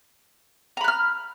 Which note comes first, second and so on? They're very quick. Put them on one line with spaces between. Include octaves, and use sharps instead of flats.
A#5 B5 F#6 F6